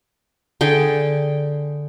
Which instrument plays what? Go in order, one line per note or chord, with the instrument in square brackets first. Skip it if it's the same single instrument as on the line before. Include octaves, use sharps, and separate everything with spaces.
[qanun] D3 G#4 G5